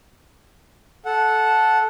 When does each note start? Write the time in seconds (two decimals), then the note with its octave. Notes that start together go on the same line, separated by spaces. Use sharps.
1.05 A4 F#5